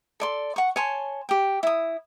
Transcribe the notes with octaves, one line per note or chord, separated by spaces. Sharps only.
A4 D5 C6
F#5 C#6
C#5 G#5 A5 C6
G4 G5
E4 D#6